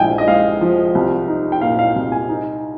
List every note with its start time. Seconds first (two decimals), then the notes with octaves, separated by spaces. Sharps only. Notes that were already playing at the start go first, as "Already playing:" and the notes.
Already playing: A#1 G#3 G5 G#5
0.18 D#5
0.28 G#3 F5
0.61 F3
0.95 C2
1.28 D#4
1.52 G5
1.61 A#2 F5
1.79 F5
1.96 C2
2.12 G#5
2.29 D#4